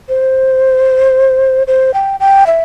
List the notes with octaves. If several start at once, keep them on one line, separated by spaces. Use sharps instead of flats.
C5
C5
G5
G5
E5